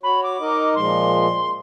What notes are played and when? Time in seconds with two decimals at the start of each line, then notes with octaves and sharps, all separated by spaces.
0.03 F#4 C#5 B5
0.23 D6
0.40 D#4 A#4 D#5
0.75 A#2 F3 G#3 C6